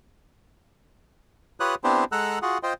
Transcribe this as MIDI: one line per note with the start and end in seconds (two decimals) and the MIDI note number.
1.60 1.75 65
1.60 1.75 67
1.60 1.75 71
1.60 1.75 73
1.60 1.75 87
1.60 1.75 90
1.84 2.04 59
1.84 2.04 60
1.84 2.04 62
1.84 2.04 64
1.84 2.04 67
1.84 2.04 72
2.12 2.39 56
2.12 2.39 69
2.12 2.39 78
2.12 2.39 82
2.12 2.39 88
2.12 2.39 90
2.42 2.58 65
2.42 2.58 66
2.42 2.58 68
2.42 2.58 78
2.63 2.73 65
2.63 2.73 72
2.63 2.73 75
2.63 2.73 79